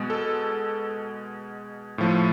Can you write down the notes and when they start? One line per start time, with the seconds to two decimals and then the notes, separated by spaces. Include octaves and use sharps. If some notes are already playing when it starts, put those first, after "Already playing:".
Already playing: B2 G#3 B3
0.10 A4
1.98 A2 F3 A3